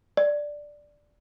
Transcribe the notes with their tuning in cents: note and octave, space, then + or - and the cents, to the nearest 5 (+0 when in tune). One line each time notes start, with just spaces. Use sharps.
D5 +0